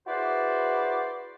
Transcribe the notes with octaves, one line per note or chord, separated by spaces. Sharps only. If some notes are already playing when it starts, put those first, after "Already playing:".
E4 F#4 G#4 B4 C5 D5